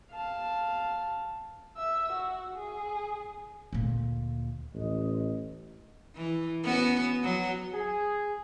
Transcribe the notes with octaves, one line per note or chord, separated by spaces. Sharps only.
F5 A5
E5 E6
F#4
G#4
D2 A#2
A1 D#5
E3
B3 C#4 F#4
F#3
G#4